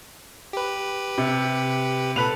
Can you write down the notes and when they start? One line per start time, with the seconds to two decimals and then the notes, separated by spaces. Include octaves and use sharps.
0.53 G4 B4
1.18 C3
2.16 A#2 A4 B4 B5 F7